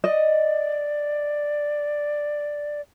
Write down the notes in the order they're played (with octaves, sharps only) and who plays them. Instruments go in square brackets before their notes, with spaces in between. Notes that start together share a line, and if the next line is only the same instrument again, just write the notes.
[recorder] D5 [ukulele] D#5